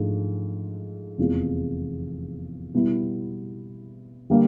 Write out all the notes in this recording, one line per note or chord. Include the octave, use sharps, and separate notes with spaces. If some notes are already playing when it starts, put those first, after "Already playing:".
Already playing: G#2 F3 A3 D4
F1 E2 C3 F3 G#3
B2 G3 B3 E4
D3 G3 A#3